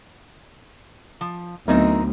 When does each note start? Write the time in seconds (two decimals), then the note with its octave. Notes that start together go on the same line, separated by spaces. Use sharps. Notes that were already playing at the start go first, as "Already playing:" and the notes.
1.21 F3
1.68 D2 F#3 B3 C4 D#4 A#4